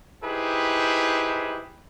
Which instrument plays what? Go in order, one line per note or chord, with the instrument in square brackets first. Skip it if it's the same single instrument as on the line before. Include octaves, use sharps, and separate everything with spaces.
[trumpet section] D#4 E4 G4 G#4 B4 C5